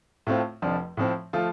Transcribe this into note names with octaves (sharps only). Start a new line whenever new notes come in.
A2 A3 C4 F4
F1 F2 F3 D4
A2 F3 C4
F3 A3 F4